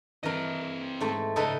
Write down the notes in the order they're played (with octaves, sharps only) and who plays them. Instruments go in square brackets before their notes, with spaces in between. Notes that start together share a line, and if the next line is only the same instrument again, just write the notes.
[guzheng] E3 A#4 [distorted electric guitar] C4 D#5
[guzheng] G#2 A3
[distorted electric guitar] G#2 C#3 [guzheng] D#4 A4 B4